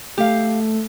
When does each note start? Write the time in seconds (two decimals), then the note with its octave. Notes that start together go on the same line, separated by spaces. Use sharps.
0.18 A3 G4 F5